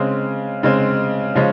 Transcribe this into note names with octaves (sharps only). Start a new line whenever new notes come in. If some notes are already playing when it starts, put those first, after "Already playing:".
Already playing: C#3 G#3 C4
C#3 G#3 C4
C#3 F3 G#3 C#4